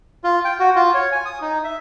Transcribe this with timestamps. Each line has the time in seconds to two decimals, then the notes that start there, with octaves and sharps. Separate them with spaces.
0.24 F4
0.45 G5
0.59 F#4
0.76 F4
0.94 C#5
1.12 G#5
1.25 D#6
1.41 D#4
1.64 E5